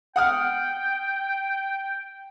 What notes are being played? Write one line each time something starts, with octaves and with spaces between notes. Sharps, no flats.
F#5 G5 D#6 F6